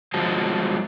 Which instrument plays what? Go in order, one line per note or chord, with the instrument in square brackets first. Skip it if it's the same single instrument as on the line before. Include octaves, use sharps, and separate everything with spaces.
[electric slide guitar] F3 G#3 F#4 C5 A5